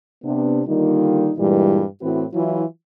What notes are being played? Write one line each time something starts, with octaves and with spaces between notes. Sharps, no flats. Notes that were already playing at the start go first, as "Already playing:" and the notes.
C3 B3 D4
D3 D#3 G3 A#3 D#4 F4
G2 A#2 E3 G3 G#3 E4
A2 E3 C4 F#4 B4
E3 F#3 E4 F4